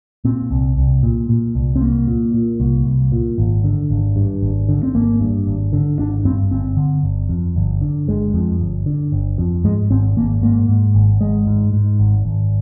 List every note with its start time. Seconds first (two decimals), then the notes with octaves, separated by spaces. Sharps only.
0.25 A#2 C4
0.51 C2
0.77 C2
1.03 A#2
1.29 A#2
1.55 C2
1.76 C4
1.81 C2 A#3
2.07 A#2
2.33 A#2
2.60 C2
2.86 C2
3.12 A#2
3.38 G#1
3.64 D3
3.90 G#1
4.16 G2
4.42 G#1
4.69 D3
4.83 C4
4.94 G#1 A#3
5.20 G2
5.47 G#1
5.73 D3
5.99 G#1 D4
6.25 G2 C4
6.51 G1 C4
6.77 D3
7.03 G1
7.29 F2
7.56 G1
7.81 D3
8.08 G1 G#3
8.34 F2
8.60 G1
8.86 D3
9.12 G1
9.38 F2
9.64 G#2 G#3
9.90 G#1 C4
10.17 G#1 A#3
10.42 G#2 A#3
10.68 G#2
10.95 G#1
11.21 G#1 G#3
11.47 G#2
11.73 G#2
11.99 G#1
12.25 G#1